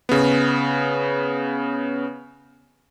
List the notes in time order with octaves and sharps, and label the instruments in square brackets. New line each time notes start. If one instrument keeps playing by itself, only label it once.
[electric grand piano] C#3 B3